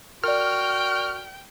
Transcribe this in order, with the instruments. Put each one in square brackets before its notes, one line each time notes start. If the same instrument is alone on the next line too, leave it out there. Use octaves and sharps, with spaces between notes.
[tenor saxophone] F#4 [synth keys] A#4 D5 [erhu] G5 [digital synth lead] F6